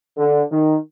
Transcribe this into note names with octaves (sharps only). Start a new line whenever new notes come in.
D3
D#3